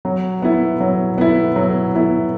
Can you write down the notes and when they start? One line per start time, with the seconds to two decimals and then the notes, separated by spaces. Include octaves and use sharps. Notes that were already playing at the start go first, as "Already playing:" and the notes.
0.05 F#3
0.42 B3 E4
0.80 F#3
1.18 B3 E4
1.56 F#3
1.94 B3 E4